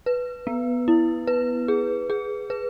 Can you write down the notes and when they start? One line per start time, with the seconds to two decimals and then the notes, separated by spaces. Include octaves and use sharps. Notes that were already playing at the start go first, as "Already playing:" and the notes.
0.06 B4
0.47 B3
0.88 E4
1.27 B4
1.68 G#4
2.10 G#4
2.50 B4